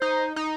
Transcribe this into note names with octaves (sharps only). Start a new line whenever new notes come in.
D#4 C5
D#4